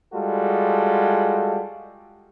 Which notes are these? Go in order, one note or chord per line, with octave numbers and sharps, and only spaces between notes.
G3 G#3 F4 F#4 A4